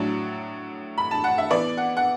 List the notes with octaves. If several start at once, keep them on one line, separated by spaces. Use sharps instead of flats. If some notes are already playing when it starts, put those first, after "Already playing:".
Already playing: A2 F#3 D4
B5
A5
F#5
E5
E3 B3 E4 D5
F#5
F#5